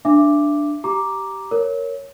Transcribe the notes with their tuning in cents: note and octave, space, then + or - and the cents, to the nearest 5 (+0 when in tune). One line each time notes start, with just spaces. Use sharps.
D4 +0 E5 +30 D6 +0
G4 -10 A#5 +5 D6 +0
A#4 +0 C#5 +0